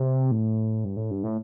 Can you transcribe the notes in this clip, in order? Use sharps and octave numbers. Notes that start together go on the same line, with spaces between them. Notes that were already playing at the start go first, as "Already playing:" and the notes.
Already playing: C3
A2
G2
A2
G2
A2